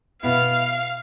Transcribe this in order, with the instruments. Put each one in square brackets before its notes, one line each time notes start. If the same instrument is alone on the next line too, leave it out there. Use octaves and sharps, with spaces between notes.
[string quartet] B2 B3 E4 F5